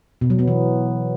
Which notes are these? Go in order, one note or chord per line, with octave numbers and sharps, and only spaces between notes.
B2
F#3
B3
E3